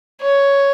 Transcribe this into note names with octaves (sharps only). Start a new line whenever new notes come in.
C#5